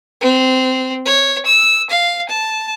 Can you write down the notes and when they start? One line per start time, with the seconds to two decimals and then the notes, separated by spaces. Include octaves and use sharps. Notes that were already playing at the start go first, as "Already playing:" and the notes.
0.21 C4
1.05 C#5
1.46 E6
1.90 F5
2.29 A5